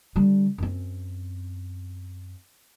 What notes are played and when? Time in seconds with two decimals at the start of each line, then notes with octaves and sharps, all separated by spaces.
0.16 D3 G3
0.58 F#2 C4